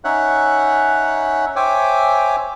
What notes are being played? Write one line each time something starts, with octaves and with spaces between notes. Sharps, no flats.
C#4 D#4 C#5 E5 F#5 F#6
C5 C#5 E5 G5 G#5 D6